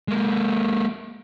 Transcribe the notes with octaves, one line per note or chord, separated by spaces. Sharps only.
G#3 A#3